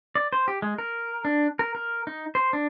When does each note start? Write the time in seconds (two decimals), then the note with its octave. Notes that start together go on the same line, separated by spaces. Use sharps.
0.15 D5
0.33 C5
0.48 G4
0.62 G#3
0.78 A#4
1.25 D4
1.59 A#4
1.75 A#4
2.07 D#4
2.35 C5
2.53 D4